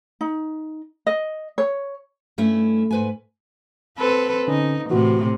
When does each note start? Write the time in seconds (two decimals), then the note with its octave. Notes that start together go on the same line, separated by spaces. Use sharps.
0.21 D#4
1.07 D#5
1.58 C#5
2.38 G2 A3 C#4 E4
2.91 G#2 B4 G#5
3.98 C4 A4 B4
4.48 D3 C#4 D#4
4.90 A2 C3 E3 F#4